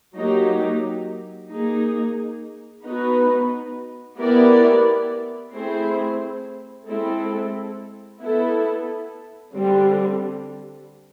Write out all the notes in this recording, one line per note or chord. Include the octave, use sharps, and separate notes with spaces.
F#3 A#3 D#4 G4
A#3 D#4 G#4
B3 D#4 F#4 B4
B3 E4 G4 A#4 D5
A3 C4 E4 G#4 C5
G#3 C4 E4 A4
B3 E4 A4
D3 G3 C4